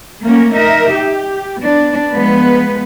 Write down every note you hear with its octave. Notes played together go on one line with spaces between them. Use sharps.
A3 A#3 C#4 A#4
D#4 A#4 E5
G4
B3 D4
F3 G#3 B3 B4